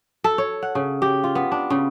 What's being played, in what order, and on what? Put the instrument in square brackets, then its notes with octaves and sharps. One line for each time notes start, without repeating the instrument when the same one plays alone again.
[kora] A4
C#5
F#5
C#3
G4
F4
B3
D4
C#3